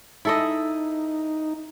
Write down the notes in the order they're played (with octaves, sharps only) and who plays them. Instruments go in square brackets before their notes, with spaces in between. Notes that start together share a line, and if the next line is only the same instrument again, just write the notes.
[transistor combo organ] D#4 [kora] E4 A4 D#5